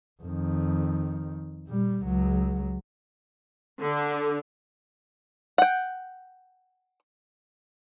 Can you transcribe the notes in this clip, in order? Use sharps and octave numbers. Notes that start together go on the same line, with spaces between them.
F2 D#3
A#2 G3
C#2 F#3
D3
F#5 G5